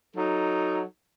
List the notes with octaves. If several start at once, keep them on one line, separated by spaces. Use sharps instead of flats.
F#3 D#4 A4